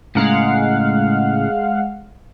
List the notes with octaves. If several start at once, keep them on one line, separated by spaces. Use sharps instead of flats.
A2 C#3 G#3 A#4 F5 F#5